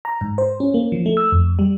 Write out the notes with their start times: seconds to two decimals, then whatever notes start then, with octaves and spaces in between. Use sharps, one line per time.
0.05 A#5
0.21 G#2
0.38 C5
0.60 C#4
0.74 A#3
0.92 F3
1.06 A3
1.17 E6
1.32 F2
1.59 G3